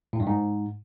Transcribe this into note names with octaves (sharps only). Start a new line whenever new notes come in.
A2
G2
G#2